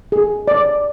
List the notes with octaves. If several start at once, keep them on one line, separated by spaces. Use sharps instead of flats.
G#4
D5